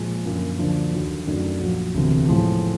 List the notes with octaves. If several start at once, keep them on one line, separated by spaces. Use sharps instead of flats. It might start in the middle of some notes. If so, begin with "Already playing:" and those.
Already playing: A#2 F3 G#3
F#2 D3 F3 A#3 C#4
D2 D3 F3 A#3 D4
D#2 D3 F#3
F#2 D#3 F#3 A3 D4
A#1 A#2 F#3
E1 D2 C3
A2 F3 G#3